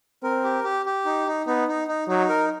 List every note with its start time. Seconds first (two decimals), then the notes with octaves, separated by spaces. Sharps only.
0.23 C4 A#4
0.44 G4
0.64 G4
0.86 G4
1.05 D#4
1.27 D#4
1.46 B3 D#4
1.68 D#4
1.88 D#4
2.08 F#3 D#4
2.29 A#4